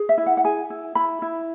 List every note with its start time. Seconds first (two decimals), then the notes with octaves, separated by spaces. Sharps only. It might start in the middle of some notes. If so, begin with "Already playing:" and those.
Already playing: G#4
0.09 E5
0.18 E4
0.26 F#5
0.37 F#5
0.44 G#4 G#5
0.70 E4
0.95 E4 B5
1.22 E4